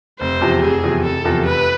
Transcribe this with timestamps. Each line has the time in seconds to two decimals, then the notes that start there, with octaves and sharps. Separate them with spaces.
0.20 F1 C5
0.41 E2 C3 F3
0.62 F1 G#4
0.84 E2 C3 F3
1.04 F1 A4
1.25 E2 C3 F3
1.45 F1 B4